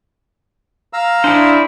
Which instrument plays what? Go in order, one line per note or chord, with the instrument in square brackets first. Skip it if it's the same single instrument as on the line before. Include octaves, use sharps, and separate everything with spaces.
[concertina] F5 A#5 E6
[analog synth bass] D4 [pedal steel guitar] E4 G#4 C5